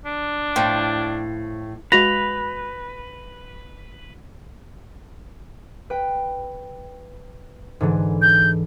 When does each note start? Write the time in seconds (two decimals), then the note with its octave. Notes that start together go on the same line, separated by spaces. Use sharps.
0.06 D4
0.56 A2 F3 G5
1.92 G#3 F#4 B4 F5 A#6 F7
5.90 B4 G5
7.81 G#2 D3 E3
8.22 G6